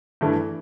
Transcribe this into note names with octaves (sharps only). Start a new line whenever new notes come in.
G2 E3 A3